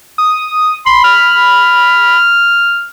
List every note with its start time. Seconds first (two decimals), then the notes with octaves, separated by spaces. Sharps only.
0.18 D#6
0.86 B5 C6
1.04 F6